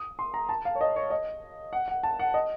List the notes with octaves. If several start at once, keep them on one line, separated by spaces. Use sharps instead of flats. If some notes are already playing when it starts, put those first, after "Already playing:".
Already playing: D#6
C6
A#5
A5
F5
C#5
D#5
C#5
D#5
F#5
F#5
A5
F#5
D#5